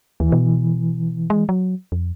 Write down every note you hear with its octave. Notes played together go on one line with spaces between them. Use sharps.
D#2 E3
B2
G#3
F#3
F2